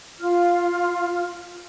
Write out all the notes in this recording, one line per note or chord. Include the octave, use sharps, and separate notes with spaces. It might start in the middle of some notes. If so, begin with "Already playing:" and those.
F4 F6